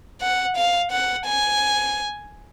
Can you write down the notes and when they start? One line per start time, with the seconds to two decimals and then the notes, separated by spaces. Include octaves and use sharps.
0.22 F#5
0.57 F5
0.92 F#5
1.26 G#5